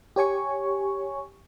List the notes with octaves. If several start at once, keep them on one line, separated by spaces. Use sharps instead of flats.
G4 C#5 G#5 C#6